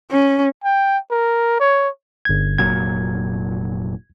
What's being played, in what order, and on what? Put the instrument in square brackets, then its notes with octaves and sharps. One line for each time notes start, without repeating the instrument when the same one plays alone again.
[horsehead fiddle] C#4
[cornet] G5
A#4
C#5
[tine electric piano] G1 G#6
[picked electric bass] F1 A#2 F#3 [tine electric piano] G#6